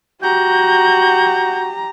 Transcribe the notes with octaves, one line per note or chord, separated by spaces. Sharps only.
F#4 G4 A#5 G6